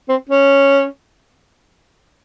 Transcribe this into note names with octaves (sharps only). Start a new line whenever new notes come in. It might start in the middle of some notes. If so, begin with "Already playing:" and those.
C4
C#4